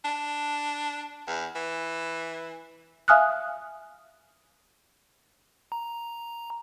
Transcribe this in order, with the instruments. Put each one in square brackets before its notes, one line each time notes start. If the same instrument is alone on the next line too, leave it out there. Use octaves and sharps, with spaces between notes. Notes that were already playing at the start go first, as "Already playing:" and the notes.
[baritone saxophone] D4
E2
E3
[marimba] E5 F5 G#5 D#6 F6 F#6
[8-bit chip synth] A#5